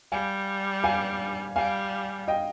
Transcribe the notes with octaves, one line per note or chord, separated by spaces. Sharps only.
G3 F5 G#5
F5 G#5
G3 F5 G#5
D#5 G5